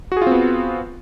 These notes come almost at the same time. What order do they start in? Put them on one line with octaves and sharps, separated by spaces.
F#4 G#4 F4 C4 B3